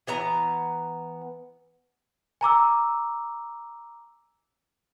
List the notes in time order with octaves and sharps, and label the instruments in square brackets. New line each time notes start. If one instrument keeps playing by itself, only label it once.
[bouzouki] E3 B3 A#5
[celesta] G#5 A#5 D6 E6